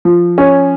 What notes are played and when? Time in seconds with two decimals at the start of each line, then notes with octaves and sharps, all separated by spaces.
0.05 F3
0.38 C#4